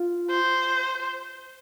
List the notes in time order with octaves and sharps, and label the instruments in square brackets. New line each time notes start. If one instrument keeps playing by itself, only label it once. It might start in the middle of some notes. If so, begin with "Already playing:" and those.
Already playing: [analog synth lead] F4
[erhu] C5